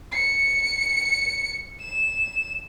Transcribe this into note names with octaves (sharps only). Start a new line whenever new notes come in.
C#7
E7